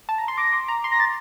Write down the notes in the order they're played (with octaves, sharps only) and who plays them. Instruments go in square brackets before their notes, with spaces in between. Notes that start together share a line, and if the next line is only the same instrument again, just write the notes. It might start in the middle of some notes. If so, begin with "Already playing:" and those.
[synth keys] A5
A#5
C6
[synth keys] D6 [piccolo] A#6
[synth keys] C6
A#5
C6
[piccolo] A#6
A6